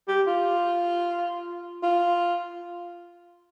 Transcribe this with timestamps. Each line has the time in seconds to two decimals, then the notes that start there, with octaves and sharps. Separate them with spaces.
0.08 G4
0.27 F4
1.83 F4